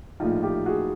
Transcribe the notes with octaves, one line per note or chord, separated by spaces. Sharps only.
A#1 A2 F3 D#4 F4
F4 G4
F#4 G#4